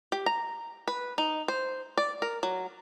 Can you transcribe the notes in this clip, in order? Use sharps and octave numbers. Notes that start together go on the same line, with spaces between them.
G4
A#5
B4
D#4
C5
D5
A#4
F#3